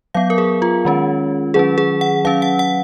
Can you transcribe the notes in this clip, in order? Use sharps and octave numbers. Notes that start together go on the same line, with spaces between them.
F#3 B3 F5
A#4
G#4
F4
D#3 G#3 C#4
D#3 F#3 C#4 G#4
G#4
F#5
F#3 C#4 F5
F#5
F#5